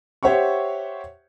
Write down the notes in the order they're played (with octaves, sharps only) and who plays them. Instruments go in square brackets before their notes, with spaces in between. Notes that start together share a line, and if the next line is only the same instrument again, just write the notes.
[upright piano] G4 C5 C#5 E5 F#5 C#6